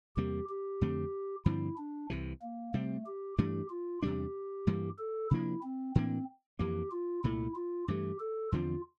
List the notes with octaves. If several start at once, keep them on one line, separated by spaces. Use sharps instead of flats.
E2 C3 G3 A#3 G4
G4
F2 D3 A3 C4
G2 D3 F3 C4 E4
D4
C2 C3 E3
A#3
C3 G3 A3 C4
G4
G2 E3 A3 D4 G4
F4
E2 C3 G3 D4 G4
G2 E3 G3 A#3
A4
C3 F3 A#3 D4 E4
C4
A2 E3 A#3 C4 D4
F2 E3 A#3 G4
F4
C2 A#2 A3 E4
F4
G2 E3 A3 G4
A4
E2 D3 F3 C4 F4